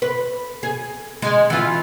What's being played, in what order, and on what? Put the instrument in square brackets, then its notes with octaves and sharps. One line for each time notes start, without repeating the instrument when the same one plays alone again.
[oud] B4
G#4
G#3
E3 F4